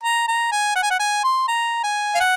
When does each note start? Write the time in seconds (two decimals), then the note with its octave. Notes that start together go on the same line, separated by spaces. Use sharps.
0.03 A#5
0.28 A#5
0.52 G#5
0.76 F#5
0.83 G#5
0.90 F#5
1.00 G#5
1.24 C6
1.48 A#5
1.84 G#5
2.15 F5
2.20 F#5